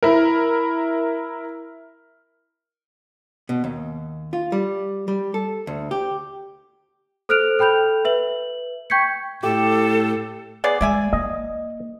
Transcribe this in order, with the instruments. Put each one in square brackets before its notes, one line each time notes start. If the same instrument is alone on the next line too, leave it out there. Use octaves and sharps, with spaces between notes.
[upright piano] E4 A#4
[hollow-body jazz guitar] B2
D#2
F4
G3
G3
A4
D2
G4
[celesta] A4 C5 F6 F#6 D7 F7
A4 G5 B5 G6 F7
B4 E5 F#7
G5 C#6 G6 G#6 B6 C#7
[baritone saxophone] A2 [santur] G4 [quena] A4
[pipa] B3 G#4 D5
[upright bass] G#3 [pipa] D5 E5 G#5
[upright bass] A#3 [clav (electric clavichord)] D#5